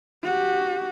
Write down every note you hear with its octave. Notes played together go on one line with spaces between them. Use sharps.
F#4 G4